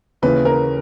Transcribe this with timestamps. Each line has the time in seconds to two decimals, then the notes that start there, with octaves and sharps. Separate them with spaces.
0.22 D#2 C#3 E3 B4
0.45 A#4